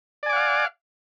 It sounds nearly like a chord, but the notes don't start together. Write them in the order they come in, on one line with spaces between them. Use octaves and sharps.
D5 G#5 D6 F#5 F5